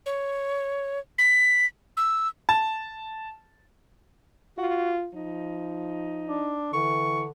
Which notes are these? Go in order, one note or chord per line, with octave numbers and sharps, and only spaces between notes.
C#5
B6
E6
A5
F4 F#4
F3 D#4
D4
D3 E3 C#6